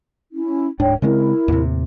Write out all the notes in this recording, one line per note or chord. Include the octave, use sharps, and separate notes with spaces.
C#4 E4
D1 G#2 D4 C#5 G5
C#3 G#3 C4 E4 A#4
D#2 A2 C3